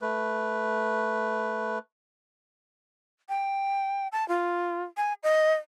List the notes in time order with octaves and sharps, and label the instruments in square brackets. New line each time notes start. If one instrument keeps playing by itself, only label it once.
[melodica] A3 B4
[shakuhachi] G5
A5
F4
G#5
D#5